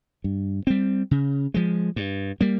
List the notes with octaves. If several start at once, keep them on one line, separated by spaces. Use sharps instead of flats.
G2
G3 C4
C#3
F3 G#3
G2
G3 A#3